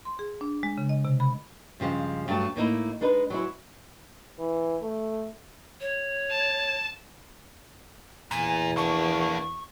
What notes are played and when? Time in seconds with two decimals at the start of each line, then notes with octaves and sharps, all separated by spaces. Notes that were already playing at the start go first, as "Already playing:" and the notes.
0.05 C6
0.19 G#4
0.41 D4
0.63 G#3
0.78 C#3
0.89 D#5
1.05 C3
1.20 B5
1.80 G2 C#3 F3 G#3
2.28 G2 F#3 A3 A5
2.56 A2 A#3 D#4 E4
3.01 G#3 D4 D#4 B4
3.30 F#3 G#3 E4
4.39 E3
4.82 A3
5.81 C#5
6.30 A5
8.31 E2 A#2 G#5
8.77 A#3 D4 C#6